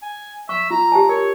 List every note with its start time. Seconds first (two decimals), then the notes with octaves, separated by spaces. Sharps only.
0.02 G#5
0.49 E5 C#6
0.71 F4 A#5
0.92 G4 G#5 A5
1.09 A#4 C#5